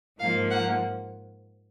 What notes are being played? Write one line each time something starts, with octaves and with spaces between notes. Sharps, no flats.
G#2 F3 A#3 F5
F#5